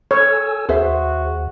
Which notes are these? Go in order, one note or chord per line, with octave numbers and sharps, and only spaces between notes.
A4 C#5 G#5 E6
D#2 F#4 G#4 C5 E5